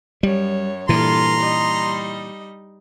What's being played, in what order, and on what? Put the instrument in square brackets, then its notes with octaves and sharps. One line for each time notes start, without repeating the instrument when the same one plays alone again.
[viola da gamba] F#2 C#5 [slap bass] G3
[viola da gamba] G2 F4 A4 [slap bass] A#2 E3 [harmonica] A#5 C6
[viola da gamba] G3 D#4 D#5